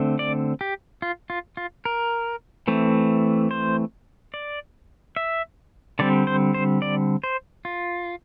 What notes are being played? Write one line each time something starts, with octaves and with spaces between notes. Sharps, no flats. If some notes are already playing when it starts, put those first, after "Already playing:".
Already playing: D3 A3 C4
D5
G4
F4
F4
F4
A#4
E3 A3 C4
C5
D5
E5
D3 G3 C4 D5
C5
C5
D5
C5
F4